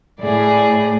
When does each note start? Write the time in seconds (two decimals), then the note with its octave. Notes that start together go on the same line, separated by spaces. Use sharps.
0.20 A2 G#4 D5